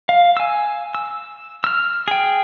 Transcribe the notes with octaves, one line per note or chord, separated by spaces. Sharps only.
F5
G#5 E6
E6
E6 F6
G#4 G5